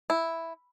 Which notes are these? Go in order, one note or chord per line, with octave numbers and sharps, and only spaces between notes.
E4